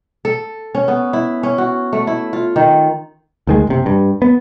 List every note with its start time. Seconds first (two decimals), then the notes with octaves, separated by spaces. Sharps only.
0.25 A4
0.75 C#4
0.88 B3
1.13 E4
1.43 C#4
1.58 F#4
1.93 A3
2.07 E4
2.33 F4
2.56 D#3
3.47 D2 D#3 G#3
3.67 F#1 C3
3.86 G2
4.22 B3